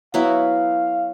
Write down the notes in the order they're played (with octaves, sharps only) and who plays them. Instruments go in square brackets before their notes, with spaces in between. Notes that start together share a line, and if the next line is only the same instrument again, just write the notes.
[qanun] F#3 B3 E4 [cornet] F5